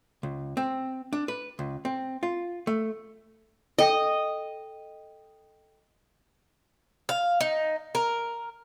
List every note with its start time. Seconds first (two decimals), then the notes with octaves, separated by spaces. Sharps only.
0.23 C#2
0.57 C4
1.13 D4
1.28 B4
1.59 C#2
1.85 C4
2.23 F4
2.67 A3
3.79 A4 D#5 G5
7.09 F5
7.40 D#4
7.95 A#4